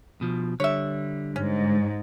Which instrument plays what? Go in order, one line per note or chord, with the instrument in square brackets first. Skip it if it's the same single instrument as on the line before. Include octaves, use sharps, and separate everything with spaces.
[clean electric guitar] B2 F3
[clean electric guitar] D3 G3 [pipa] C#5 E5
[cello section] G#2 [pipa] C#4